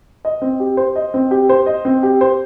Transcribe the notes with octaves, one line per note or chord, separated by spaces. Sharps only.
D#5
C4
G4
C5
D#5
C4
G4
C5
D#5
C4
G4
C5